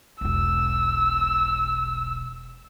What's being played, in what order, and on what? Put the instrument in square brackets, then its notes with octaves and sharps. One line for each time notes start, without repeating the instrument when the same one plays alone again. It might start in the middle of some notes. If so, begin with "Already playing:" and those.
[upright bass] E1 B1 [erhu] E6